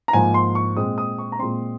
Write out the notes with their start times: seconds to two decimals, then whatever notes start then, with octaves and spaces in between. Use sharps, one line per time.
0.08 A#5
0.13 G#2 F3 A#3 G#5
0.34 C6
0.55 C#6
0.77 A#2 G#3 C4 D#6
0.98 D#6
1.18 C#6
1.32 A#5
1.39 A#2 G#3 C4 C6